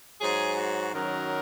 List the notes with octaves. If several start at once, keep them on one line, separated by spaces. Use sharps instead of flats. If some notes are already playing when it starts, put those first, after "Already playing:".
G#2 F#3 G#4
F#4
F#2 D#3 F#3 A#4